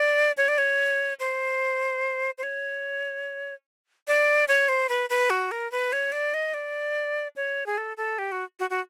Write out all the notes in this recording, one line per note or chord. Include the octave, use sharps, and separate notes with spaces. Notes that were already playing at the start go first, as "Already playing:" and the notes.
Already playing: D5
C#5
D5
C#5
C5
C5
C#5
D5
C#5
C5
B4
B4
F#4
A#4
B4
C#5
D5
D#5
D5
C#5
G#4
A4
A4
G4
F#4
F#4
F#4